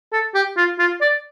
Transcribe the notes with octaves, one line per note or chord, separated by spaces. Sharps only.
A4
G4
F4
F4
D5